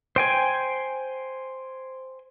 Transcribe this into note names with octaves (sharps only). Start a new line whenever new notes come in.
C5 G5 G#5